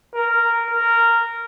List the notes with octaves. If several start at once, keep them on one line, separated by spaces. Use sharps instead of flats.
A#4
A#4